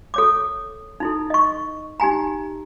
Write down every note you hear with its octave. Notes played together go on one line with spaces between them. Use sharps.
A4 C#5 D6
D#4 E4 A4
D#5 C#6
D#4 G4 G#5 A#5